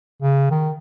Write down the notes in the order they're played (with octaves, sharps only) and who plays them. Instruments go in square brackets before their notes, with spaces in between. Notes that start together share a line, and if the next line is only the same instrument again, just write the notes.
[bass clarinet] C#3
D#3